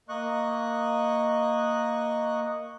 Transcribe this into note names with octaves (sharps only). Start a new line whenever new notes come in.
A#3 D#5 C#6 F#6